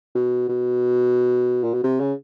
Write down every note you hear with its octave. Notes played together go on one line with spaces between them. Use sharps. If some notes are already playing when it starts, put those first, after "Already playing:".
B2
B2
A#2
B2
C3
C#3